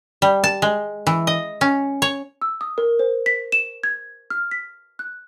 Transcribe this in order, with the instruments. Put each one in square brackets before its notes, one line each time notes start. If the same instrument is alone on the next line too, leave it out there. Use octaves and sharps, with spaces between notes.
[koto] G3
A5
G#3
E3
D#5
C#4
C#5
[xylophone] E6
D#6
A#4
C5
B6
E7
G#6
F6
B6
F#6